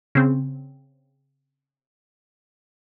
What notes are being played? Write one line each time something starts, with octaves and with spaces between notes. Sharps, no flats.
C#3 C4